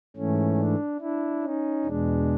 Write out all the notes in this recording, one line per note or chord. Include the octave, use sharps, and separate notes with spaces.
G#2 E3 A3 C#4
D4
D4 E4
C#4 D#4
E2 B2 G#3 D4